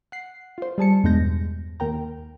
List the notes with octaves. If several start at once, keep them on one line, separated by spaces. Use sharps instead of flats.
F#5 C7
F4 C5
G3 G#4 A5 C#7
E2 G2 B2 G#3 G6 A#6
D#2 A#4 G5 A#5